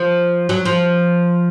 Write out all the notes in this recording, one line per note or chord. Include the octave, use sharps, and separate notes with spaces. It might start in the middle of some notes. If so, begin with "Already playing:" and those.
Already playing: F3
F#3
F3